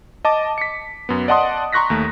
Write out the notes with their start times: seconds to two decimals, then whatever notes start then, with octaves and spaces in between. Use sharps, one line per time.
0.25 D#5 A5 D6
0.58 B6 C#7
1.09 F#2 B3
1.28 D5 D#5 F#5 A5 C6 D#6
1.73 A#5 C6 C#6 F#6 A#6 B6
1.90 D#2 A3